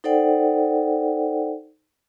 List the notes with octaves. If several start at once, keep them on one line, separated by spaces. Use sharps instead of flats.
D#4 A4 C5 D5 F#5 G5